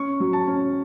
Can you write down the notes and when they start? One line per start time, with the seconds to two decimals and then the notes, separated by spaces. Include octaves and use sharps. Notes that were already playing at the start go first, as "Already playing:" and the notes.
Already playing: C#4 C#6
0.20 F#3
0.33 A5
0.47 C#4